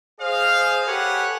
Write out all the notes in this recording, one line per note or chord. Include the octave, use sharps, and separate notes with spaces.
G#4 C5 D#5 F5
G4 A4 B4 C#5 F#5 G#5